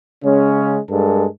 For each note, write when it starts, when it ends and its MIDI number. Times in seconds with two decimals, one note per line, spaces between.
0.24 0.79 49
0.24 0.79 56
0.24 0.79 61
0.90 1.26 43
0.90 1.26 56
0.90 1.26 69
0.90 1.26 70